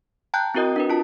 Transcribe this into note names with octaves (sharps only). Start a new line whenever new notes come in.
G5 A5 A#5 F#6 G6
C4 E4 F#4 A#4 D#5 D#6
D4 A#4 B4
F4 A5